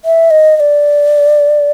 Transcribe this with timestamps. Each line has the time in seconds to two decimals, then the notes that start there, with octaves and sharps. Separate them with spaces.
0.05 E5
0.31 D#5
0.57 D#5
0.60 D5